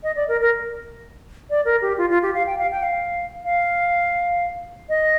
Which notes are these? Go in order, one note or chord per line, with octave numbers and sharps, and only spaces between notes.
D#5
D5
A#4
A#4
D5
A#4
G4
F4
F4
G4
F5
G5
F5
G5
F5
F5
D#5